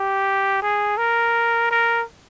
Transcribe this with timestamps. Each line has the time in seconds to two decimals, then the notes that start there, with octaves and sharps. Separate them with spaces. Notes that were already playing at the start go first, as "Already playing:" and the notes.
Already playing: G4
0.62 G#4
0.98 A#4
1.71 A#4